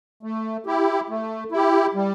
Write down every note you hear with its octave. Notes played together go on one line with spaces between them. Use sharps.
A3
E4 G4
A3
E4 G4
G3